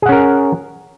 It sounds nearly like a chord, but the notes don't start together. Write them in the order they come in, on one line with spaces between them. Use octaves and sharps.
G#4 F#5 C#4 A#4